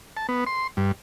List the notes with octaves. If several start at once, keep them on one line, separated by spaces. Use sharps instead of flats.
A5
B3
C6
G2